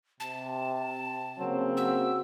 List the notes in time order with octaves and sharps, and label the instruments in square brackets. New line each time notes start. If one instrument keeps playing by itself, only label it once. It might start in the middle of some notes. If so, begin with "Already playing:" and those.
[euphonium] C3 [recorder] A5
[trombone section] C#3 A#3 C4 [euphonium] F#3
[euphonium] F#4 [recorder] E6